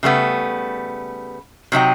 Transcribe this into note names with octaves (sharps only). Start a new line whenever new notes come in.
C#3 G3 A3 B3
C3 F#3 D#4 G5